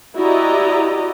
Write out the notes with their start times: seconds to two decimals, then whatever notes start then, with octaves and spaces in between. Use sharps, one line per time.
0.16 E4 F#4 G4 D5 D#5 A#5